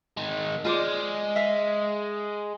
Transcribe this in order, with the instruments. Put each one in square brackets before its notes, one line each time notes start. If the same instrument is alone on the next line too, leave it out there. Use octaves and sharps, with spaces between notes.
[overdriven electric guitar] D#3 G#3
[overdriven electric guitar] G#3 [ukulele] F4 C5 D5
[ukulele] E5 F5